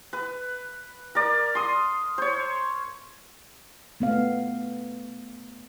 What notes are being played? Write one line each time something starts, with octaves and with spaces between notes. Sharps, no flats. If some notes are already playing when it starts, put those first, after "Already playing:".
B4
A#4 D5
C6 D#6
C5 C#5
A3 B3 F5